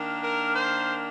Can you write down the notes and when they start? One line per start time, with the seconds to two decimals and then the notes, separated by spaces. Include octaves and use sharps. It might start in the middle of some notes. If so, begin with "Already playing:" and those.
Already playing: D#3 A#3 D4
0.23 A#4
0.53 C5